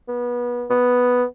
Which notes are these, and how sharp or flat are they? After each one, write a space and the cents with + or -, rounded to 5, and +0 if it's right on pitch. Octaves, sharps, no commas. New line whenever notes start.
B3 -25
B3 +0